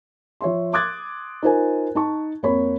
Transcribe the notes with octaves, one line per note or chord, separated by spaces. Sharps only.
F3 C#5 E5 C6
C6 D6 D#6 F#6 G#6 A6
D#4 F4 A#4 C5 G#5
D#4 A5 C#6
F2 A#3 C#5 B5